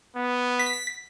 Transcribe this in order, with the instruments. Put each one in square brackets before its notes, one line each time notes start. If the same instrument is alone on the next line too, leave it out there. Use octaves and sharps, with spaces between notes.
[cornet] B3
[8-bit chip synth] B6